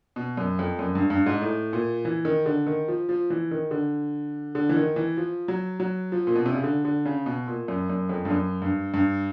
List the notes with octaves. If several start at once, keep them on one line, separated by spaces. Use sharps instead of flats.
B2
F#2
F2
F#2
G2
G2
G#2
A2
A#2
E3
D#3
D3
D#3
F3
F3
E3
D#3
D3
D3
E3
D#3
E3
F3
F#3
F#3
F3
A#2
B2
C3
C#3
D3
D3
C#3
B2
A#2
F#2
F#2
F2
G2
F#2
G2
G2